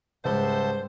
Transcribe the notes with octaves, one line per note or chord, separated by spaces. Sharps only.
C#2 G#2 G3 C5 E5 F#5 A5